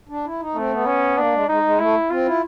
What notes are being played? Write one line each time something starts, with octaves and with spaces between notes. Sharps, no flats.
D4
E4
D#4
A3 C4
B3
C#4
A#3 D4
G#3
G#3 D#4
G#3
A3 E4
C4 F4
E4